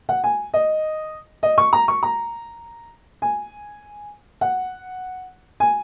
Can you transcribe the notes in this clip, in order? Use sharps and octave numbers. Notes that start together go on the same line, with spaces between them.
F#5
G#5
D#5
D#5
C#6
A#5
C#6
A#5
G#5
F#5
G#5